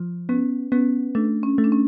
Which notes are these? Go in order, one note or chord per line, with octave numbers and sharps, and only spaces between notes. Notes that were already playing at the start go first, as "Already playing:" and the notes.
Already playing: F3
B3 C#4
B3 C#4
A3 D4
C#4
A3
D4
C#4